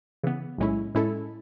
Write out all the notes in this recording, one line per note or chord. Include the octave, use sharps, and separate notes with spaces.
C#3 E3 B3
B1 A2 G#3 C#4 E4
A2 G#3 C#4 E4 A4